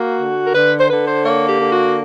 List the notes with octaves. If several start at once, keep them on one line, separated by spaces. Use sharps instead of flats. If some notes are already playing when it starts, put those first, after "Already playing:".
Already playing: A#3 F#4
D3
A#4
D3 B4
C5
D3 B4
C5
A#3 C#5
G4
D3
F#4